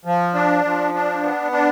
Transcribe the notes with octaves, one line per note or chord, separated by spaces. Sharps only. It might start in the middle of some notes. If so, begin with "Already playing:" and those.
F3
D4
F3
D4
B3
D4